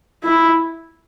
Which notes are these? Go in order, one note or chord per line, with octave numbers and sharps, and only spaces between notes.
E4